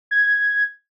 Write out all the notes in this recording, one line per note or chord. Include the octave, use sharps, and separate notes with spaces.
G#6